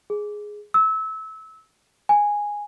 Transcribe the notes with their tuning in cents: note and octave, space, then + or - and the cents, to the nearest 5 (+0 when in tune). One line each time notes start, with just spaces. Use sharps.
G#4 +5
E6 -25
G#5 -5